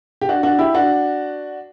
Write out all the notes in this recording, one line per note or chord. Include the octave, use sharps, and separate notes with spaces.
G4
D4 F#4
D4 F#4
E4 G4
D4 F#4